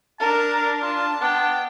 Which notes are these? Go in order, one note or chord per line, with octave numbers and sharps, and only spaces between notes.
D4 A#4 A5
F4 A5
B3 D4 G5